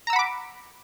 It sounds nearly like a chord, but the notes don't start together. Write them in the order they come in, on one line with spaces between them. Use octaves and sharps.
A#5 E6 F#5 B5 D6